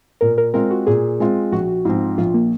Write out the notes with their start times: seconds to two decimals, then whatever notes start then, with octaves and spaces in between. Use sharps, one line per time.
0.21 A#2 A#4
0.38 A#4
0.54 G#3 C4 F4 A#4
0.71 F#4
0.87 A#2 G#4
1.20 G#3 C4 F4
1.52 A#1 F#4
1.85 G#2 F3 C4
2.18 A#1 F4
2.34 A#3